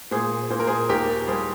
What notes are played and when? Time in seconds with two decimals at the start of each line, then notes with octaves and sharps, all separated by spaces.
0.11 A#2 G#4 C5
0.50 A#2 C5
0.59 A#4
0.67 G#4 C5
0.89 D#2 G4 A#4
1.27 G3 G#4 C5